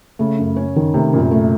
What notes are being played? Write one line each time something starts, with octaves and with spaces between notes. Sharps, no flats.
C#3 A3
F#2
C#4
D#3
C3 A3
F#2 A#2
A3